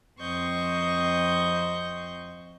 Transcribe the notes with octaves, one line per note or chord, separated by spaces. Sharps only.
F2 C4 C5 D#5 C#6 G6